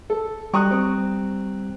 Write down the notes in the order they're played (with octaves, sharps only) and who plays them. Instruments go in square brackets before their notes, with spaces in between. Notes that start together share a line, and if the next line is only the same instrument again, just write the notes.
[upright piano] A4
[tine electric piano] G3 G5 A#5 [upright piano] C#6 D#6 F#6
[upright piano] C4